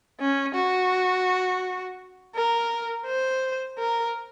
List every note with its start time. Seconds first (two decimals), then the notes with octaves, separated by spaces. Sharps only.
0.21 C#4
0.56 F#4
2.36 A#4
3.06 C5
3.79 A#4